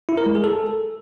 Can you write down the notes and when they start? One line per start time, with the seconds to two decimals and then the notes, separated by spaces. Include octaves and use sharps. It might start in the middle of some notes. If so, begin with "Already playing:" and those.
0.09 E4
0.17 A#4
0.26 G#3
0.35 G#4
0.44 A4